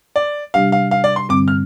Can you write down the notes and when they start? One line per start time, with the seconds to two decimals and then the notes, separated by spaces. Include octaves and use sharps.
0.16 D5
0.54 C3 G3 D4 G4 F5
0.72 F5
0.91 F5
1.04 D5
1.16 C6
1.29 G2 D3 G3 C4 D6
1.48 F6